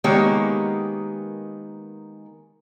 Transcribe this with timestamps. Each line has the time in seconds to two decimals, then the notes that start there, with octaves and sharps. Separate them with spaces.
0.04 D#3 G#3 A#3 B3 G4 C#5